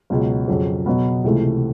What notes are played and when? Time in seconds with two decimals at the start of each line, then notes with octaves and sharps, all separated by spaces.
0.10 C#2 B2 F#3
0.48 F2 C#3 F#3
0.86 B2 F#3 B3
1.24 C#2 C3 E3 A3